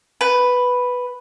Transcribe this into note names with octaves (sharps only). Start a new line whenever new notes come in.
B4